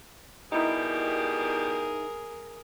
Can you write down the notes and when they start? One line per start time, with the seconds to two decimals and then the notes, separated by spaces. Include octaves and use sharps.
0.52 B2 G3 D#4 E4 G4 G#4 A#4